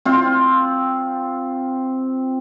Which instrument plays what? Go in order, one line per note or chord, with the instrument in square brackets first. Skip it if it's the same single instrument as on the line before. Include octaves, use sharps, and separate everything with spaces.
[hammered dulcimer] C4 F4